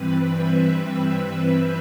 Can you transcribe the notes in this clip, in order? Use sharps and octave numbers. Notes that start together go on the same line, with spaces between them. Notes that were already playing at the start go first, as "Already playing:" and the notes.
Already playing: G2 E3 G3 C4 B4
E5